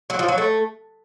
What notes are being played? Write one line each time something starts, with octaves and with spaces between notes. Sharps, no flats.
F#3
F3
F#3
A3